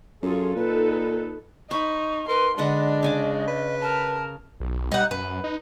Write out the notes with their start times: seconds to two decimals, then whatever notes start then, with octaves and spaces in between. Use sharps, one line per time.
0.23 F#2 F4 G#4 A4
0.56 A#2 D#4 A4 B4
1.71 D#4 C5 B5 C#6
2.28 A#4 B4 C6
2.58 D3 G#3 D4 B4 D#5 F#5
3.03 C#3 G#5 D6
3.48 B4
3.81 A#4 A5
4.60 B1
4.92 G3 D#4 F#5
5.11 F#2 B4
5.44 D#4